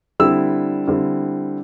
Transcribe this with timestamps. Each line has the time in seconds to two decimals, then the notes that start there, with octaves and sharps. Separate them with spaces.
0.20 D3 G3 C4 E4 E6
0.88 D3 G3 C4 E4